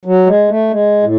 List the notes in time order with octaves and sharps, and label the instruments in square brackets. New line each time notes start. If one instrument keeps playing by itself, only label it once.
[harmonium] F#3
G#3
A3
G#3
A2